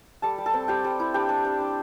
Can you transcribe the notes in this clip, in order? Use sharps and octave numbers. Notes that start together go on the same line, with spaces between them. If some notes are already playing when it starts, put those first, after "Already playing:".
G3 A4 A5
G3
A4 A5
C4
G3 G4 G5
G3
E4
D4 G4 G5
D4
D4
D4